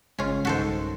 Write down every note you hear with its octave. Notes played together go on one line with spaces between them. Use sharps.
G#1 C#3 G#3 C#4 F4
B1 G2 D#3 F#4 A4 C5